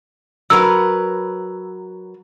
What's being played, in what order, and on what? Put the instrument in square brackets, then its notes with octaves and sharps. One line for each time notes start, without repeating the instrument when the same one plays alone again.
[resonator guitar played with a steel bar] F#3 A#4 B4 [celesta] E6